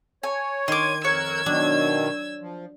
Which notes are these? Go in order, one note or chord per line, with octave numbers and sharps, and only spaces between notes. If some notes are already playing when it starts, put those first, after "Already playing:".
C#5 G#5
D#3 C6 D6 G#6 D#7
F2 A#4 C#5 E6 F#6 G#6
B2 D#3 F#3 D4
F3